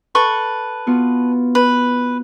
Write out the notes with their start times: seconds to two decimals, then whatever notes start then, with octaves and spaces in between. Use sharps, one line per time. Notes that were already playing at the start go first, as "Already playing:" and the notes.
0.15 A4 B4 C#6
0.87 B3 F4 F#4
1.55 B4